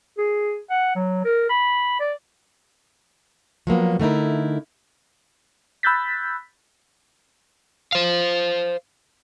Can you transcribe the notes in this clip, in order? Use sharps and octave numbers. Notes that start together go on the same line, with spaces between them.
G#4
F#5
F#3
A#4
B5
D5
F3 F#3 A#3 B3
D3 A3 D#4 E4 A#4
B5 E6 F#6 G6 A6 B6
C5 F5